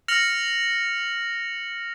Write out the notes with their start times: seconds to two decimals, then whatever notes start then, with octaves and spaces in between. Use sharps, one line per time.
0.08 F6 A#6 C#7 F7 F#7